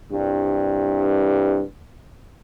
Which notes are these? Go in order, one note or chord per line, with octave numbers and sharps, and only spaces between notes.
C2 G2